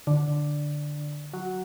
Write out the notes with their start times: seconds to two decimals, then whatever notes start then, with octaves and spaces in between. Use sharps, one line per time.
0.07 D3
1.34 F#3